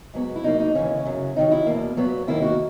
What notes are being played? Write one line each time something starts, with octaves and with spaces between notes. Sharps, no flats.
G#2 F#3 B3
E4
B2 F#3 A#3 D#4
D#4
D#2 C#3 E3 C#4
F#2 C#3 F#3
D#2 D#3 F#3 D#4
E4
E2 B2 A#3
A#2 F#3 B3
D#2 D#3 A#3 E4
F#4